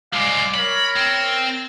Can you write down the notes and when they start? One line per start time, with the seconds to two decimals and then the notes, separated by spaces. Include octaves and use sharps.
0.13 C2 G#3 D5 F5 D6
0.54 A#4 C#5 B5
0.97 C4